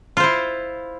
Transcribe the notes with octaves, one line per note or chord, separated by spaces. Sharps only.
E4 F4 C5